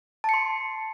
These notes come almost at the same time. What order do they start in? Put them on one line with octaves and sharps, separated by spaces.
A5 C#7 C6